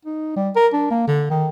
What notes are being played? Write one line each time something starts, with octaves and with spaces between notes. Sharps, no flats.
D#4
G3
A#4
D4
A#3
D3
D#3